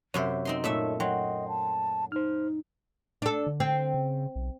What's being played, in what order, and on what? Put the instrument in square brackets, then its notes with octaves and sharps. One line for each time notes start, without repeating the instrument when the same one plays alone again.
[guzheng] F#2 C3 C5 [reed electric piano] C#5 E5
[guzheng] C4 D#4 C6 [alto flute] D#5
[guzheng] A#2 A3 E5 [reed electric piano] D#4 A4 C#5
[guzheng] F#3 [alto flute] D#5 [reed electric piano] G5 C6
[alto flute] A5
[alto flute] D#4 [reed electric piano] C5 F6
[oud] D4 A4
[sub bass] D3
[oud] C4
[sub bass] C#3
B1